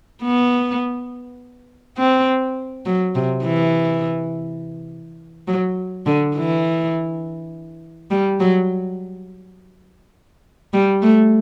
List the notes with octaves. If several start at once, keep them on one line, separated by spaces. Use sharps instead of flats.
B3
C4
F#3
C3
E3
F#3
D3
E3
G3
F#3
G3
A3